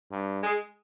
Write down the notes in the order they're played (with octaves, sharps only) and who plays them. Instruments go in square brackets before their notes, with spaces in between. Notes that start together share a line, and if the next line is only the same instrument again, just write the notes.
[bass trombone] G2
[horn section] G#3